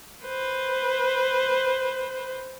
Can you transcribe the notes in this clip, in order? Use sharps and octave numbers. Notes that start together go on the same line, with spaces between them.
B4 C5